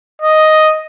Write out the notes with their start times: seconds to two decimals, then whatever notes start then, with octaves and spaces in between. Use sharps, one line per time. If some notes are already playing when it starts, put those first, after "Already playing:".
0.22 D#5